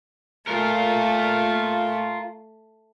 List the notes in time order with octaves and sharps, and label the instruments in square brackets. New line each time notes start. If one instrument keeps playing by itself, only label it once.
[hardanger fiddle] A3 [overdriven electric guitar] F4 A#4